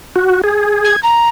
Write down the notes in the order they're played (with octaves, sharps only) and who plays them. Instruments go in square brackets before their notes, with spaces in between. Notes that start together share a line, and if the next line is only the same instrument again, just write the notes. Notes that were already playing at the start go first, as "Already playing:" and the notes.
[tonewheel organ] F#4
G#4
[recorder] G#6
A#5